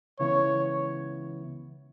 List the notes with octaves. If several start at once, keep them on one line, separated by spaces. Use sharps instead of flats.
C#2 C#3 E3 B3 E4 C#5